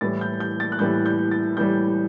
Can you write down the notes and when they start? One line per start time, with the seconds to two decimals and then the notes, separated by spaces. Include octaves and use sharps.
0.01 A2 E3 G3 A6
0.21 G6
0.40 G6
0.60 A6
0.72 F#6
0.79 A2 E3 G3 G6
1.06 G6
1.31 A6
1.57 A2 E3 G3 G6